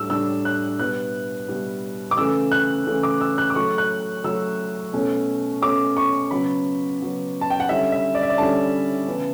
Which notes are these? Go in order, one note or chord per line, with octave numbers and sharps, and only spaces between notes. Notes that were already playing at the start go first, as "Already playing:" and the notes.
Already playing: A2 G3 D4 E6
A2 G3 D4 E6
F#6
B2 G3 B3 E4 F#6
B2 G3 B3 E4
D6
C#3 E3 A3 E6
F#6
C#3 E3 A3
D6
E6
F#6
D6
F#3 A3 E4 C#6
F#6
F#3 A3 E4 E6
B2 A3 C#4
B2 A3 C#4 D6
C#6
C#3 F#3 B3 B5
C#3 F#3 B3
A5
G5
F#5
D3 G3 C#4 E4 E5
E5
D5
E5
D5
D3 G3 C#4 E4 A5
C#3 E3 B3 E4